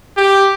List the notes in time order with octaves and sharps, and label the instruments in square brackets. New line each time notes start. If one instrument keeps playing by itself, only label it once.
[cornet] G4